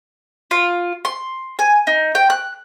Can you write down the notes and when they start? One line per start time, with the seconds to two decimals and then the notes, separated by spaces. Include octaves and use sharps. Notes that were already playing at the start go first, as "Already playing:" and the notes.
0.51 F4
1.05 C6
1.59 G#5
1.87 D#4
2.15 G5
2.30 F#6